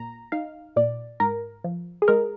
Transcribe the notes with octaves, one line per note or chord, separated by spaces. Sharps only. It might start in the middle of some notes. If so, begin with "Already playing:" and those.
Already playing: A#2 A#5
D#4 F5
A#2 D5
G#2 A#4
F3
G#4
G#3 A#4